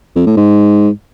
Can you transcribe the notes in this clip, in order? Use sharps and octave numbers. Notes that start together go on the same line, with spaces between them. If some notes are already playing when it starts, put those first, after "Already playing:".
F2
A2
G#2